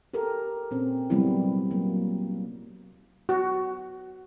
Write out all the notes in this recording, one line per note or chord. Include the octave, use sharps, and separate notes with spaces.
G4 A4 A#4
A#2 C4 C#4
C3 F#3 G3 B3 C4 E4
F#3 A#3
F#4